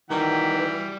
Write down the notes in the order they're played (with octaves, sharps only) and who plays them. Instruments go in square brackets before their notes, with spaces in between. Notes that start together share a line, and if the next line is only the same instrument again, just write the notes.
[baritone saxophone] D#3 [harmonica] E3 G5 [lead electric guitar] G3 F#4 [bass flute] B4